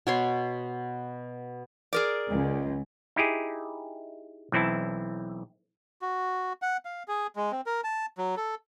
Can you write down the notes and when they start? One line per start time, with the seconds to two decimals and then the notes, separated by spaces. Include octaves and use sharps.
0.07 B2 C#5 C6
1.93 G#4 A#4 D5
2.29 C#2
3.16 D#4 E4 G4 G#4
4.52 B1 E3 C4 E4 A5
6.02 F#4
6.62 F#5
6.85 F5
7.08 G#4
7.36 G#3
7.52 C4
7.66 A#4
7.84 A5
8.18 F#3
8.37 A4